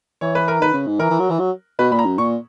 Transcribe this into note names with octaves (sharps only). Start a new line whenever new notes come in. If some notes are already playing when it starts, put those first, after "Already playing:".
E3 C#5
B4
A#4
D#3 B4
C#3
G#2
E3 A#4
E3
F#3
E3
F#3
B2 B4
A#2 B5
A#5
F#2
A#2 C#6